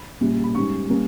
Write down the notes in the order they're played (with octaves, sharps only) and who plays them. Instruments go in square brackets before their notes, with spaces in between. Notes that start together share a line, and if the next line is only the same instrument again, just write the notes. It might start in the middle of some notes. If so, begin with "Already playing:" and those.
Already playing: [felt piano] B5
A#1 A#2 G3 C#4
B5
G#2 G3 C#4 C#6
G3 A#3 C#4